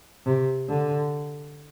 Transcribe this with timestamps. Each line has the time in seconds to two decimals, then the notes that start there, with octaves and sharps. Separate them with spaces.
0.27 C3
0.69 D3